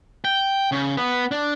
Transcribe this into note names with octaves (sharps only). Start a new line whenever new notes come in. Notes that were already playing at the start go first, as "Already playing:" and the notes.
G5
C#3
B3
D4